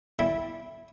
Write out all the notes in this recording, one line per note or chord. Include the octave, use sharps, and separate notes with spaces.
G3 E4